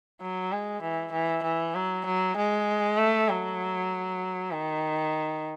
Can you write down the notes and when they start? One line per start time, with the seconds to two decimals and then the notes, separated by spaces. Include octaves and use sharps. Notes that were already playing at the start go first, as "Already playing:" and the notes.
0.21 F#3
0.52 G#3
0.83 E3
1.12 E3
1.44 E3
1.75 F#3
2.06 F#3
2.37 G#3
2.98 A3
3.29 F#3
4.51 D#3